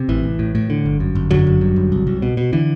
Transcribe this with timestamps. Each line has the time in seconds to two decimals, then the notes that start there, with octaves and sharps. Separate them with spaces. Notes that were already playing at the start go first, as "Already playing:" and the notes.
Already playing: C3
0.09 A1 E3
0.24 A1
0.39 A2
0.55 A2
0.70 D3
0.85 G1
1.00 F#2
1.15 G1
1.31 F#2 D3 F#3
1.47 G1
1.61 G2
1.76 G1
1.92 C2
2.07 C2
2.22 B2
2.37 B2
2.53 D3 E3